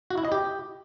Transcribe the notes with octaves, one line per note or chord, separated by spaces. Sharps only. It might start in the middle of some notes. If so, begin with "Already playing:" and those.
F#4
E4
D#5
G4